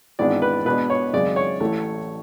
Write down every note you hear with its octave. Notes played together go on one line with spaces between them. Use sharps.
G#1 G#2 E3 B3 D4 D5
B4
B2 G#3 B3 D4 B4
C#5
G#1 F#2 C#3 G#3 D5
C#5
A1 A2 E3 A3